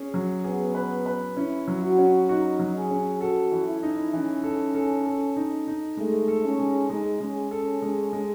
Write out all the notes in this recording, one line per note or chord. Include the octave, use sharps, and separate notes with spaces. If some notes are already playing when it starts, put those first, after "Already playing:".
Already playing: C#4 G#4
F#3
B3 G#4
B4
B4
C#4 E4
F#3
F#4
C#4
D#4 F#4
F#3
G#4
C#4
F#4 A4
E3
E4
D#4
E3 C#4
A4
A4
A4
D#4
D#4
G#3 A3
A4
C#4
G#3
G#3 D#4
G#3 C#4
C#4 A4
G#3 C#4
G#3